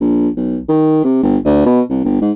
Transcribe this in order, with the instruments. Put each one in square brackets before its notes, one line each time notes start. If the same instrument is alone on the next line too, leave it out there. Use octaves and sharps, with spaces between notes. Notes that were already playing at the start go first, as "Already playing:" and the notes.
[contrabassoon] A#1
B1
D#3
C3
G1
D2
B2
C2
G1
G#2